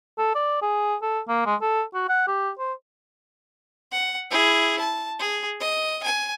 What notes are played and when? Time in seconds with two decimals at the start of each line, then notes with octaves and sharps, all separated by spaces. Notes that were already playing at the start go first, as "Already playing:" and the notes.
0.18 A4
0.35 D5
0.62 G#4
1.02 A4
1.28 A#3
1.46 G#3
1.61 A4
1.94 F#4
2.09 F#5
2.28 G4
2.58 C5
3.92 F#5
4.30 E4 G#4
4.80 A5
5.19 G#4
5.61 D#5
6.03 G#5